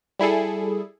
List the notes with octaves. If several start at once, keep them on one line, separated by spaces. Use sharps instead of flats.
G3 E4 G#4 A4